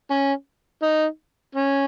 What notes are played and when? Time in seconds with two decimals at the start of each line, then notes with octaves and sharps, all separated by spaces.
0.10 C#4
0.82 D#4
1.55 C#4